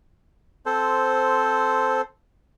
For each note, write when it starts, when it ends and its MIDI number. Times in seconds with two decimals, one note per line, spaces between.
0.66 2.01 60
0.66 2.01 69
0.66 2.01 72